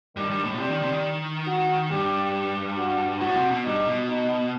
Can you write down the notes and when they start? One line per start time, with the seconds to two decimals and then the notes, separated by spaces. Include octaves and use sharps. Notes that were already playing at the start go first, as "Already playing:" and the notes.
0.16 G2 D#3
0.30 G2
0.44 A2
0.54 B2
0.60 C3 G3
0.70 D#3
0.82 C3
0.92 D#3
1.47 F#4
1.91 G2 G4
2.77 F#4
3.21 A2 F#4
3.36 C3
3.51 B2
3.65 G2 D#4
3.87 B2
4.09 D#4